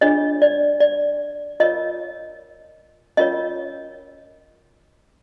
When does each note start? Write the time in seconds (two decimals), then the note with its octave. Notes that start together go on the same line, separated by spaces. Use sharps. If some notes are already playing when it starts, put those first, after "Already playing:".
0.01 D4 F4 G#4 C#5 D#5
0.42 D5
0.80 D5
1.60 F4 A#4 C#5 D#5
3.17 C#4 F4 A#4 C#5 D#5